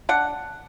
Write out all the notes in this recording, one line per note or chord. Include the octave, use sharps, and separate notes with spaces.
D4 F#5